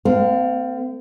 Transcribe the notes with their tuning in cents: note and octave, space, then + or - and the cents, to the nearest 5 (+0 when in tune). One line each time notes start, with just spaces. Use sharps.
A3 +35 C4 -40 F5 +0